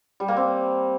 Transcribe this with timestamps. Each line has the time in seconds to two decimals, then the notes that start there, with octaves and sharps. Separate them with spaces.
0.20 G3
0.28 A#3
0.37 C4